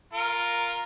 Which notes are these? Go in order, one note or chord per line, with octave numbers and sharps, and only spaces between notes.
F4 A#4